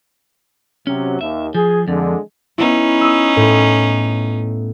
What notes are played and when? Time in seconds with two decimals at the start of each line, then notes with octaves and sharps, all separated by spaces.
0.87 C3 F#3 C#4
1.21 D#2 E5
1.55 F3 G#4
1.88 F2 D3 G#3
2.58 B3 C#4 D#4 E4
3.01 D#6 E6
3.37 A2